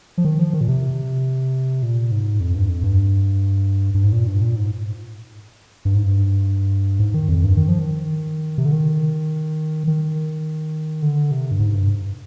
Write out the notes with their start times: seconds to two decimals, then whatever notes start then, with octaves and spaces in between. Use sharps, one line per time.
0.18 F3
0.25 D#3
0.39 F3
0.54 D#3
0.61 A#2
0.68 C3
1.83 A#2
2.11 G#2
2.40 F2
2.55 G2
2.69 F2
2.83 G2
3.94 G2
4.04 G#2
4.13 A#2
4.27 G2
4.41 A#2
4.56 G#2
5.85 G2
5.95 G#2
6.04 G2
7.00 G#2
7.14 D#3
7.28 F2
7.43 G2
7.57 D#3
7.68 F3
7.79 D#3
8.58 C3
8.65 D3
8.72 D#3
9.87 D#3
11.02 D3
11.31 C3
11.51 G2
11.60 G#2
11.74 G2